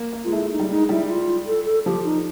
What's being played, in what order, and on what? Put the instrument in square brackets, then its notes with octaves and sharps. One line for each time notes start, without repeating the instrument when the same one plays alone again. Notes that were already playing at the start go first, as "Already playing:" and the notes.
Already playing: [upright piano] A#3
A#3
[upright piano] G#3 [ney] F4
[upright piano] A3 [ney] E4
[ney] D#4
[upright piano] G3
[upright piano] G#3 [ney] D#4
[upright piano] G3 [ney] E4
[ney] F4
A4
A4
[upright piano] F3 [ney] G4
[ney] D#4